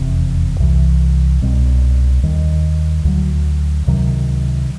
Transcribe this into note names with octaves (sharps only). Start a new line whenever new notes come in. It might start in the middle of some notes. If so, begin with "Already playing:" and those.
Already playing: F1 E2 C3
C2 C3 E3
C2 B2 G3 C4
D#2 D#3 G3
D2 D3 F#3
C#2 C3 D#3 F#3